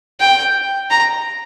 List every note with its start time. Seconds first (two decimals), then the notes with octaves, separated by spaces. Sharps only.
0.20 G5
0.91 A#5